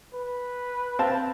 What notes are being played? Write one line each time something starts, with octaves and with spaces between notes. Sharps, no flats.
B4
C4 F5 A5